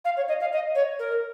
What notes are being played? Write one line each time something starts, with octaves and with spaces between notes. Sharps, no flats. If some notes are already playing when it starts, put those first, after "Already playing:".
F5
C#5
D#5
F5
D#5
C#5
A#4